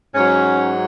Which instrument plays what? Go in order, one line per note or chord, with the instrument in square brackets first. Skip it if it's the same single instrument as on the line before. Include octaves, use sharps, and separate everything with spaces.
[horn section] G#2 F#3 C#4